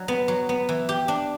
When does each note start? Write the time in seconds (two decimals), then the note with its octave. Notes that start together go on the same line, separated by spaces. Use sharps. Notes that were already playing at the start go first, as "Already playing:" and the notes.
Already playing: F#3 D4
0.08 B3
0.28 F#3
0.49 B3
0.69 E3
0.89 G4
1.08 D4